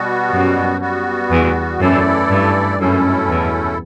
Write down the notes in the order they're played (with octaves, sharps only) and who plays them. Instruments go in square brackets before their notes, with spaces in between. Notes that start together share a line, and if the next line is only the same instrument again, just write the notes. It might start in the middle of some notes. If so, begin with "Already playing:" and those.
Already playing: [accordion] B2 G3 B3 F#4
[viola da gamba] F#2
[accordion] G3 B3 F#4
[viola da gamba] E2
[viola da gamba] F#2 [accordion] E3 A3 E4 A4 D5
[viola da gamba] G2
[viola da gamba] F#2 [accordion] B2 A3 C#4 E4 A4
[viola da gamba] E2